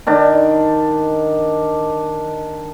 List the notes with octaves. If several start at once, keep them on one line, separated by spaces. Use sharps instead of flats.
D#3 D4